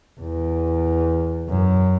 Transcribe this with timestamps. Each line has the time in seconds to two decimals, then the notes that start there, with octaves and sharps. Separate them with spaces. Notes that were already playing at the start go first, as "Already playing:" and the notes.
0.20 E2
1.49 F#2